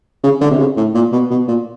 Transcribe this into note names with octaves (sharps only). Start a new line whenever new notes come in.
C#3
D3
C3
C#3
A2
A#2
B2
B2
A#2